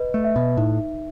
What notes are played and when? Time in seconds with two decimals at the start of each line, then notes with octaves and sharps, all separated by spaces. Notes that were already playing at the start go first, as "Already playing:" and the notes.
Already playing: B4 D#5
0.14 A3
0.24 E5
0.36 B2
0.57 A2 D#4